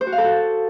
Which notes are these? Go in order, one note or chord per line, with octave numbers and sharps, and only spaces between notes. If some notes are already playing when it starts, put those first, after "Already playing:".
C5
F#4
F5
A4
F#4